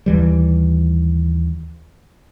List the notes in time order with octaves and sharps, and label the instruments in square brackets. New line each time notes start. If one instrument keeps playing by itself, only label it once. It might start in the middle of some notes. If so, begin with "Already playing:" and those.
[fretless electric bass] D#2 E3 G3